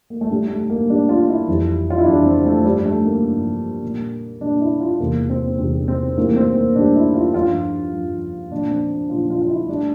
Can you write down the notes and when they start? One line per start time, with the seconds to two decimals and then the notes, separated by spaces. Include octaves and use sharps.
0.10 A#3
0.21 A3
0.31 A2 G3
0.50 A3
0.70 A#3
0.90 A2 G3 D4
1.09 F4
1.29 E4
1.48 F2 E3 G3
1.90 F4
1.98 E4
2.06 F2 E3 G3 D4
2.26 C4
2.46 A3
2.65 G2 F3 G3
2.85 A3
3.04 A#3
3.24 G2 F3
3.83 A#2 G3
4.41 A#2 G3 D4
4.61 E4
4.81 F4
4.99 E2 C3 G3 A#3
5.30 C4
5.58 E2 C3 G3 C4
5.88 C4
6.17 A2 E3 G3 A#3
6.36 C4
6.57 A#3
6.75 A2 E3 G3 D4
6.96 E4
7.14 F4
7.34 G2 F3 F4
7.93 G2 F3
8.51 A#2 F3 D4
8.71 C4
8.90 D4
9.10 A#2 F3 F4
9.30 F4
9.42 F4
9.50 E4
9.68 A2 G3 D4